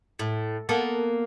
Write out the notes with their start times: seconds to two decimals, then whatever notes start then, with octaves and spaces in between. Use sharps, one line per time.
0.19 A2
0.69 A#3 B3 A4